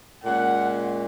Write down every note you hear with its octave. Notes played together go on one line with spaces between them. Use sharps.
A#2 G#3 C#4 F#5